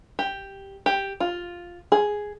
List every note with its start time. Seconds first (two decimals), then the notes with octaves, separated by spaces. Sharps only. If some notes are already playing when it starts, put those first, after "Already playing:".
0.19 G4
0.86 G4
1.20 F4
1.92 G#4